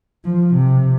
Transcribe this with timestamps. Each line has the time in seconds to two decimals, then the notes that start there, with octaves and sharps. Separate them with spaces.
0.24 F3
0.54 C3